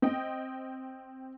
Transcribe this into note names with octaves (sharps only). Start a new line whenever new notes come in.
C4 D#5 G5